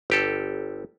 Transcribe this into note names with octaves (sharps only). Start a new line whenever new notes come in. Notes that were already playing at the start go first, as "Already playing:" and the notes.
G1 G4 A4